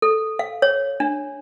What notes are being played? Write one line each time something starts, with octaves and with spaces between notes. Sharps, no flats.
A4
F5
C#5
D4